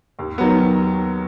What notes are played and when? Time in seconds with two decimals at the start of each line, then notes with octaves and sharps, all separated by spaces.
0.19 D#2
0.38 D#3 F#3 B3